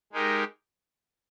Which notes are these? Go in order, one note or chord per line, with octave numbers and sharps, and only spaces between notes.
G#3 D#4 G4 A#4